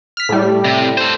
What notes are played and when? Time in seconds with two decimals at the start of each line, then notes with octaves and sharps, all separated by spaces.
0.17 F6 B6
0.29 A2 G3
0.64 C3
0.97 A4 C5